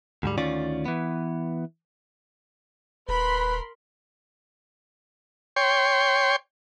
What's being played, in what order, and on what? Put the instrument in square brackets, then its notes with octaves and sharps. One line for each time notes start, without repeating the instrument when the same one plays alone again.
[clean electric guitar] D2 G#2 G3
D2 D#3 C#4 F4 D5
E3 B3
[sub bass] D#1 [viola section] A#4 B5 C6 [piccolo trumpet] B4
[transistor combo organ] C#5 G5 C6